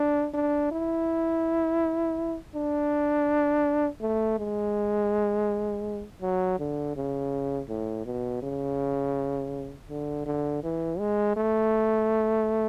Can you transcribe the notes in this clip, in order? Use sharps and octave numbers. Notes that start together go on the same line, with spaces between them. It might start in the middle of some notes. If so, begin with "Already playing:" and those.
Already playing: D4
D4
E4
D4
A3
G#3
F#3
D3
C#3
A2
B2
C#3
D3
D3
E3
G#3
A3